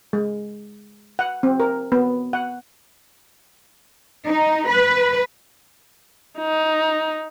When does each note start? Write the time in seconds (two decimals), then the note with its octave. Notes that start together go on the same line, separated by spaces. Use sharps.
0.13 G#3
1.19 F#5
1.43 C4
1.60 A#4
1.92 B3
2.33 F#5
4.28 D#4
4.67 B4
6.38 D#4